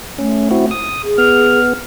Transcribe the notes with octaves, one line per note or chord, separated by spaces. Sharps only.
A3 C#4
C4 E4 F#4
D#6
G#4
B3 F6